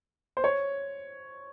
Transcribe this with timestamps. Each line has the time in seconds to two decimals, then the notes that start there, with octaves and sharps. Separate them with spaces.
0.37 C5
0.44 C#5